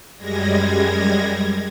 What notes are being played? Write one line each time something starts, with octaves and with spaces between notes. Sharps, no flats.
F#2 G3 G#3 G#6 A#6